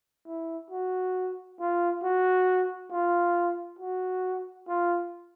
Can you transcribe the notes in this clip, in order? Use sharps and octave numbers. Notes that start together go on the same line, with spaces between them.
E4
F#4
F4
F#4
F4
F#4
F4